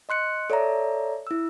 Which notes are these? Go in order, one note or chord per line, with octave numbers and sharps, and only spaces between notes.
D#5 C6 F#6 C#7
A4 C#5 D5 E5 A#5
E4 E6